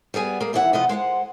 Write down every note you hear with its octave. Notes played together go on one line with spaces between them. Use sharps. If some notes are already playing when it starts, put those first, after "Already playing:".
G3 B3 G#4 G#5
A#3 G#4
D#2 E3 E4 C#5 F#5
C3 E3 F3 F4 D#5 F#5
G#3 C5 F5 F#5